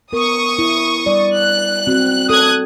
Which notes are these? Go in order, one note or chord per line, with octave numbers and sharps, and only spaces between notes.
B3 A#4 C#6 D#6
E4
G3 D5
F#6
C4 F#4
A4 D#6 F#6 G#6